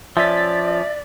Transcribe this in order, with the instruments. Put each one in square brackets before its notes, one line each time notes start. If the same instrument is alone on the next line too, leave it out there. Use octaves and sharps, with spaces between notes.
[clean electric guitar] F3 C#4 [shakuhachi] D5 [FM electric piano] E5 A6 B6